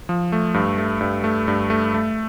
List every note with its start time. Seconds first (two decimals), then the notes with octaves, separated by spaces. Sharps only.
0.09 F3
0.32 A3
0.54 G2
0.78 A3
1.01 G2
1.24 A3
1.48 G2
1.70 A3
1.94 A3